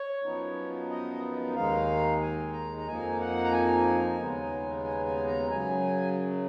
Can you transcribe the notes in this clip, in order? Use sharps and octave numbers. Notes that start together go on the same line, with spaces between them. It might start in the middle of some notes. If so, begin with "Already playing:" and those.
Already playing: C#5
F#2 F3 B3 D#4
D#5
D#2 D#3 G#3 D#4 F5
G#5
A#5
A#5
F2 F3 A#3 D#4 G#5
F#5
A#5
G#5
D#2 C#3 G#3 B3 D#4
G#5
G#5
A#5
F#2 C#3 F#3 G#5